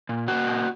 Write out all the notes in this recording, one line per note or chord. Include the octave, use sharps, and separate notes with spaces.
A#2
A#3 F#4
A#2